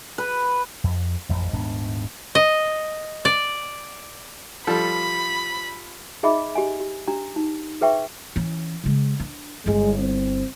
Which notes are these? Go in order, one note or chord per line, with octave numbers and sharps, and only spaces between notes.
B4
F2
A1 F2
D#1 G#2 B3 D4
D#5
D5
F3 G3 A4 B5
D#4 G#4 D#5 E5 B5 D6
G4 D#5 G#5
G4
D4 G4 A#5
D#4
G#4 B4 E5 G5 C#6
E3 C#4
C#3 G#3
D4
G1 G#3 E4
C4